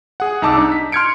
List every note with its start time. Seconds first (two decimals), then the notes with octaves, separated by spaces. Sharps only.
0.20 G#4 F#5
0.42 C2 D#4 A5 D6 E6
0.57 D4 D#4
0.72 B6
0.92 C6 F6 G6 G#6 C#7 D7